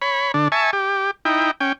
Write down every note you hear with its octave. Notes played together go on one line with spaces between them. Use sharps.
C#5 B5
D3 D4
E5 G#5 A5 C#6
G4
D#4 E4 G5
C#4 G5